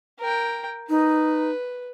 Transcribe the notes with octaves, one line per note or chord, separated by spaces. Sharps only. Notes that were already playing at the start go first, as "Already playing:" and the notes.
A#4 G5
D#4 B4